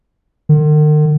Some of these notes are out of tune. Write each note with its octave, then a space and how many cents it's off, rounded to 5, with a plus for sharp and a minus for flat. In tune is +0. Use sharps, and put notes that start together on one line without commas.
D#3 -45